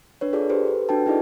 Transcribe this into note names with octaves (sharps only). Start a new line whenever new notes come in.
D4 B4 C#5
F4 G#4 A4 D5
G4 A4 B4 C5
B4
D4 F#4 A4 B4 G5 A5
D#4 E4 G#4 D5 D#5